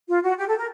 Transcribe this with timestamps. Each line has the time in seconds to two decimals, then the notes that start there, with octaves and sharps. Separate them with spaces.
0.09 F4
0.23 F#4
0.38 G4
0.48 A4
0.58 A#4